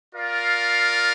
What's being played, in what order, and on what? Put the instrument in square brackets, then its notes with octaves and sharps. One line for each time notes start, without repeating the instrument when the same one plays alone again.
[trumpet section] F4 A#4 D5 F5